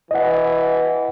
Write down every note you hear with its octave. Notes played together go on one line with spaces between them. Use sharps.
E3 D#5 F#5